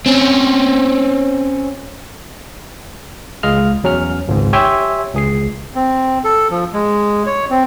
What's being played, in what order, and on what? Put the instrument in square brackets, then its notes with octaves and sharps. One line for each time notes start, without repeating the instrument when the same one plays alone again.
[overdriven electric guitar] C4 C#4
[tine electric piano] C#2 G#3 D#5 F5 F6
E2 F#3 C#4 F6
G#1 C#2 G#2
G4 C#5 E5 G5 G#5 C6
C#2 G#4 C7
[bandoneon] C4
A4
F3
G#3
C#5
C4